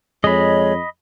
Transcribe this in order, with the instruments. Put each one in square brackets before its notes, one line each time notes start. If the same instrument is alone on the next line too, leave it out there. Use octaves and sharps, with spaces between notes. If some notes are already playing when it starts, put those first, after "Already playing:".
[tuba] F2 [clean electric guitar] G#3 [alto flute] C#5 [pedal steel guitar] D#5 B5